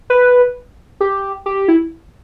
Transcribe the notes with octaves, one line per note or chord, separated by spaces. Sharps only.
B4
G4
G4
E4